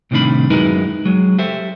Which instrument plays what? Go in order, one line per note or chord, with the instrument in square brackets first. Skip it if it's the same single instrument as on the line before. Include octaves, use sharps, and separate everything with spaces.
[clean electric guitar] C2 A2 C3 D#3 D4 B5
F#2 G#3 D#4 E4 A#4 B4
F#3 G#3
G4 A4 C5 E5